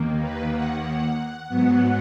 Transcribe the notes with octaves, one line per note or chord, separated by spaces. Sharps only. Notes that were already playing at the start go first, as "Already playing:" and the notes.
Already playing: D#2 D#3 A#3
B4
F#5
G#2 F#3 B3